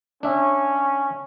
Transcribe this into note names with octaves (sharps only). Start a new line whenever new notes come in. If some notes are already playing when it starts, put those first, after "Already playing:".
C#4 D4 E5